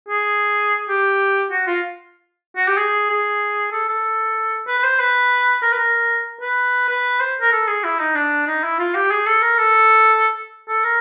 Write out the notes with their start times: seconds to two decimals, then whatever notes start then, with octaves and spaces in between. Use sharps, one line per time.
0.09 G#4
0.89 G4
1.51 F#4
1.67 F4
2.56 F#4
2.67 G4
2.77 G#4
3.10 G#4
3.72 A4
3.89 A4
4.67 B4
4.78 B4
4.84 C5
5.00 B4
5.62 A#4
5.72 B4
5.78 A#4
6.41 B4
6.88 B4
7.20 C5
7.41 A#4
7.52 A4
7.67 G#4
7.84 E4
8.00 D#4
8.15 D4
8.47 D#4
8.63 E4
8.79 F4
8.95 G4
9.11 G#4
9.26 A4
9.42 A#4
9.58 A4
10.68 A4
10.84 A#4